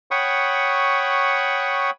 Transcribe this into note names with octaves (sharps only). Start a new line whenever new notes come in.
C#5 F#5 G5 B5 C#6 D#6